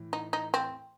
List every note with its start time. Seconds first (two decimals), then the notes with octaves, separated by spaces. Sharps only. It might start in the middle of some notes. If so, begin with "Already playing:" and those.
Already playing: A2 E3
0.13 D#4
0.33 D#4
0.54 C4